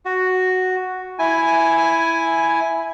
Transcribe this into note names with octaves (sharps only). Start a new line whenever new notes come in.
F#4
E4 G#5